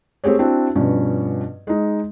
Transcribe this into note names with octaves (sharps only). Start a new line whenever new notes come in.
A3 C4 G4 G#4 C#5
C4 D4 E4 F#4
G2 B2 F3 C#4
G#3 D#4